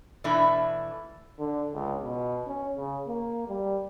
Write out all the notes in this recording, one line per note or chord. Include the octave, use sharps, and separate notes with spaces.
B2 E3 A3 D4 E4
D3
C#2
B2
C#4
C#3
A#3
G3